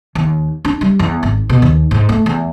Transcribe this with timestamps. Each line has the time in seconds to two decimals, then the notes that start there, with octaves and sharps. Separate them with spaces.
0.15 D#2
0.65 D4
0.81 G3
0.99 E2
1.23 G#1
1.49 B2
1.62 D#2
1.91 G#2
2.09 A3
2.26 E2